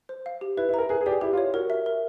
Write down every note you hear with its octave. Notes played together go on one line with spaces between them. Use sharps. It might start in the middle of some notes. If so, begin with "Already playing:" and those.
C5
F5
G4
E4 B4
E4
A#4 A#5
G#4 B4
G#4
G4 D5
G#4
E4 G4
F4
C#5
F#4 A#4
E5
A#4